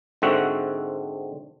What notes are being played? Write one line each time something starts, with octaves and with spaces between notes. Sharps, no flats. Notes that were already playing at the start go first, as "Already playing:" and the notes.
G#2 D3 C4 F#4 E5 F#5